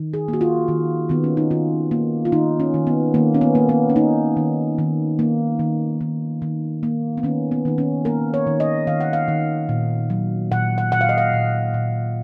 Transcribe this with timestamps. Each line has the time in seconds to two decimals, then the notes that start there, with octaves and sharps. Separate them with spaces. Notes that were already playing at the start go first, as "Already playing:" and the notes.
Already playing: D#3
0.14 G#4
0.28 A#3
0.33 F#4
0.41 F4
0.68 D#3
1.09 D#3 B3
1.24 C#4
1.37 D#4
1.51 D#3 F4
1.91 A#3
2.25 F4
2.32 D#3 D#4
2.60 C#4
2.74 D#3
2.87 B3
3.14 D#3 A#3
3.34 C#4
3.41 B3
3.55 A#3
3.69 B3
3.90 C#4
3.96 A#3 D#4
4.37 D#3
4.78 D#3
5.19 A#3
5.59 D#3
6.01 D#3
6.42 D#3
6.83 A#3
7.17 B3
7.23 D#3 C#4
7.51 B3
7.65 D#3 D#4
7.78 C#4
8.05 A#3 A#4
8.34 C#5
8.47 D#3
8.60 D#5
8.87 D#3 F5
9.01 F#5
9.13 F5
9.28 D#3
9.69 A#2
10.10 F#3
10.51 A#2 F#5
10.78 F#5
10.92 A#2 F#5
11.01 F5
11.09 D#5
11.18 F5
11.33 A#2
11.74 A#2